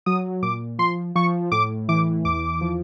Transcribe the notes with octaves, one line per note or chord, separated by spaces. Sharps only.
F#3 D#6
A#2 D6
F3 C6
F3 C#6
A2 D6
E3 D6
E2 D6
F3